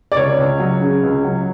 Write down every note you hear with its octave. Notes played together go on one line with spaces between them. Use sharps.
D5
C#2 C#5
C#2
F#3
C#3
C#2
F#3